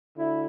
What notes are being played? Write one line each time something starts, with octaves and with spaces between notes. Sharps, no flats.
D2 D3 E4